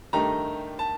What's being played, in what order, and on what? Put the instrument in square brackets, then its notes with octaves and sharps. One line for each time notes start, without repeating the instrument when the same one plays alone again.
[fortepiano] G2 D#3 A3 D#4 G4 [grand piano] A#5
[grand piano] A5